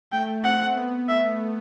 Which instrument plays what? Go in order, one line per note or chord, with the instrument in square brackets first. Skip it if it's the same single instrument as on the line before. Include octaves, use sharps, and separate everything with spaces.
[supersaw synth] A3 [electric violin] G5
[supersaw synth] C4 [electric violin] F#5
[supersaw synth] B3
[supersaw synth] A3 [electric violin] E5